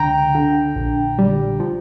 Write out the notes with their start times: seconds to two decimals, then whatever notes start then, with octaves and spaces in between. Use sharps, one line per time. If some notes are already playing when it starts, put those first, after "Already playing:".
Already playing: C#2 D3 G5 A#5
0.35 D3
0.76 A#1
1.19 G3
1.60 F3